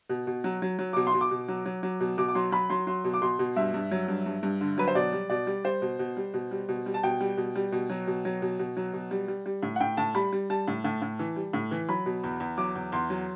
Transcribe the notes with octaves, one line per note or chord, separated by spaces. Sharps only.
B2
B2
F#3
F#3
F#3
B2 D6
C6
B2
D6
B2
F#3
F#3
F#3
B2
B2 D6
D6
F#3 C6
F#3 B5
F#3 C6
F#3 C6
B2
D6
B2 C6
B2
G2 E5
G2
F#3
G2
G2
G2
D3
F#3 B4
C5
B2 D5
G3
B2 D5
G3
G3 C5
B2
B2
G3
B2
G3
B2
G3
A5
B2 G5
G3
B2
G3
B2
F#3
B2
F#3
B2
B2
F#3
B2
G3
G3
G3
A2
F#5
A2 G5
A2 A5
G3 B5
G3
G3 A5
A2
A2
A2
E3
G3
A2
E3
F#3 B5
B2
E2
E2
F#3 D6
E2
E2 C6
F#3